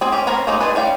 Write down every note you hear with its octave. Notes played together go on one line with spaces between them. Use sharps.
C4 G#4 G5
C#4 G4
C4 C#4 A#4 A#5 B5
F#3 G#3 A#3 B3 D#4
G#3 D4 G#4 B4
G3 C#4 F5 G5